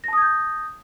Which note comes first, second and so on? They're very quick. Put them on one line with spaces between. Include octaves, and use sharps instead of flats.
A#6 A5 D#6 G#6 G6